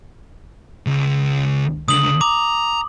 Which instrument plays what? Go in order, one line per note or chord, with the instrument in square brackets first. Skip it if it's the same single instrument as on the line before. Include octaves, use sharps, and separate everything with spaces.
[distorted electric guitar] C#2
[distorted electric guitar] C#2 D3 [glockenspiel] D#6 F#7
[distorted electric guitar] A#5 [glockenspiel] D6